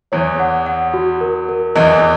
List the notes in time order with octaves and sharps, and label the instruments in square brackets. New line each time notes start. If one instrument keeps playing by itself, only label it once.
[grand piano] E2 E3 [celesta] C#5
[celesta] F#5
F#5
F#4
A#4
A#4
[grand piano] E2 E3 [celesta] D#5